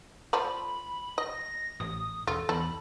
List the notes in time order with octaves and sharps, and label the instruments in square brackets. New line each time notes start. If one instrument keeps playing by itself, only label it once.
[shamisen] F3 A3 D5 [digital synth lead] B5
[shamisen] D#5 [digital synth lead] A#6
[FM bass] A1 [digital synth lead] D#6
[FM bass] E1 [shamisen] F4 [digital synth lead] A4
[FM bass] E2 [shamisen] A4 [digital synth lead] B5